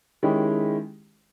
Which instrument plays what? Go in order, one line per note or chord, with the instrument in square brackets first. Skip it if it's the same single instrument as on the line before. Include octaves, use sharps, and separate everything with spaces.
[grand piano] D#3 G#3 C#4 E4 G4